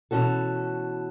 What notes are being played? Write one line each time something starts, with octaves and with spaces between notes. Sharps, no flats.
B2 E3 C#4 F#4 A4